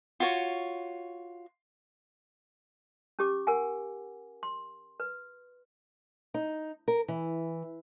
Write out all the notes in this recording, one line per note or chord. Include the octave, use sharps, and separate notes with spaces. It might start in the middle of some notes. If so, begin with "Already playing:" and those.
F4 F#4 C#5
C#4 G4 D6
A#4 F#5 G#5
C6
B4
D#4
A#4
E3